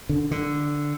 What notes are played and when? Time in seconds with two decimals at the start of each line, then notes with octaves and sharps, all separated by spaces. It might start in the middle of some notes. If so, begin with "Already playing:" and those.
0.09 D3
0.31 D3